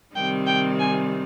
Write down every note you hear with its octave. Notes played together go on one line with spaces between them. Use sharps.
C3 D#3 G3 C4 G5
G5
G#5